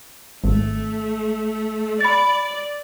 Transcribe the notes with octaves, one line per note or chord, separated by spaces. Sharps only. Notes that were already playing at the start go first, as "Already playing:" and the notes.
G#1 A3
D5 B5 A6